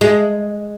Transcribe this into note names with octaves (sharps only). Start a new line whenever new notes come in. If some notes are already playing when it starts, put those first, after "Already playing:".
G#3